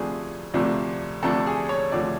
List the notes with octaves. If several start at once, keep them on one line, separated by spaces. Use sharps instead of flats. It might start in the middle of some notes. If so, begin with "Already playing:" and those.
Already playing: D2 C3 F3 A3 D4 G#4
D2 C3 F3 A3 D4
D2 C3 F3 A3 D4 A4
G#4
C#5
D2 C3 F3 A3 D4 D5